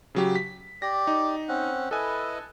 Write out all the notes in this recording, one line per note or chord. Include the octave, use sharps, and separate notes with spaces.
C#3 F#3 G4
B6
G4 D5 A#6
D#4
C4 C#4 F#5
E4 A4 B4 D#5 G#5